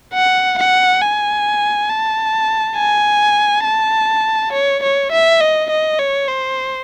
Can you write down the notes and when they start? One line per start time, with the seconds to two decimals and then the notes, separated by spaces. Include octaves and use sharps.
0.14 F#5
0.58 F#5
1.01 G#5
1.90 A5
2.77 G#5
3.65 A5
4.53 C#5
4.83 C#5
5.12 E5
5.41 D#5
5.70 D#5
5.99 C#5
6.28 C5